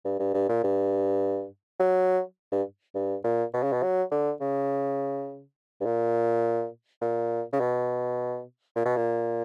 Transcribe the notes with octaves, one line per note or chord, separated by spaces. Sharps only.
G2
G2
G2
A#2
G2
F#3
G2
G2
A#2
B2
C#3
B2
F#3
D3
C#3
G2
A#2
A#2
C#3
B2
A#2
B2
A#2